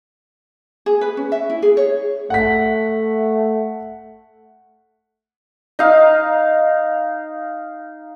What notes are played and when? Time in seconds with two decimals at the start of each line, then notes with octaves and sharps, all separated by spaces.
0.86 G#4
1.01 B4
1.17 C#4
1.32 E5
1.50 E4
1.62 G#4
1.77 C#5
2.30 A3 F#5 B6
5.79 D#4 F5